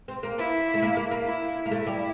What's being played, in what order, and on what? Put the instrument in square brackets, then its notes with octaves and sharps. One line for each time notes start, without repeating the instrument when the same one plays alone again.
[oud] C4
A#3
[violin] E4
[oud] A3
A#3
A#3
A#3
[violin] E4
[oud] A#3
[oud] A3 [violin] E4
[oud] G3